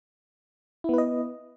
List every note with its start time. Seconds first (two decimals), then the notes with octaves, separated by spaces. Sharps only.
0.84 E4
0.89 B3
0.94 B4
0.98 D#5